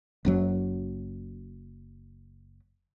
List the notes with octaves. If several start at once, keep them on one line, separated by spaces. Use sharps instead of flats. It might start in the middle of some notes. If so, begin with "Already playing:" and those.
F#1 F#2 F#3